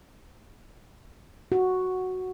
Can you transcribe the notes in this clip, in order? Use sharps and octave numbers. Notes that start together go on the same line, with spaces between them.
F#4